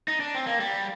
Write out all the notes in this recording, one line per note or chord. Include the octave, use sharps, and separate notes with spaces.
D#4
D4
C4
A#3
G3